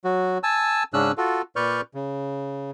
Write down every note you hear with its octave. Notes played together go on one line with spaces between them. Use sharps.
F#3 F#4
G#5 A5 E6
G#2 C#3 C#4 D4 E6 F#6
F4 F#4 A4
A#2 B4 D5 C#6 F6 G6
C#3